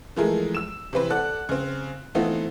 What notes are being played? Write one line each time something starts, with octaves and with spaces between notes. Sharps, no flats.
E3 F3 G#3 A3 G#4 A#4
E6 E7
C3 E3 C4 B4
A4 D5 F#5 F#6
C#3 C4
E3 A3 B3 C4 D#4 F4